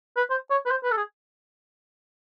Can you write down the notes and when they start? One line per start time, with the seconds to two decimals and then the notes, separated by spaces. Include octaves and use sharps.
0.16 B4
0.30 C5
0.50 C#5
0.66 B4
0.71 C5
0.83 B4
0.91 A4
0.97 G#4